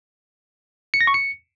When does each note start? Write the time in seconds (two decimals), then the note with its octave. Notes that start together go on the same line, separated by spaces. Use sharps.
0.94 C#7
1.01 A#6
1.07 C#6
1.14 C#7